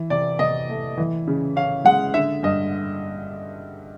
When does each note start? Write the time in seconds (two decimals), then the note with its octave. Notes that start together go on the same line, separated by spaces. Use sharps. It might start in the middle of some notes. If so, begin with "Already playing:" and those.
Already playing: E3
0.10 C3 D5
0.39 C3 D#5
0.69 A3
0.97 E3
1.28 C#3
1.56 C#4 F5
1.85 G#3 F#5
2.14 D3 E5
2.43 G2 D#5